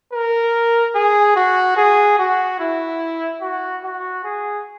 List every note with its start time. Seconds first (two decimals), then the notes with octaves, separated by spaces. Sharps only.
0.13 A#4
0.95 G#4
1.36 F#4
1.77 G#4
2.18 F#4
2.60 E4
3.41 F#4
3.84 F#4
4.24 G#4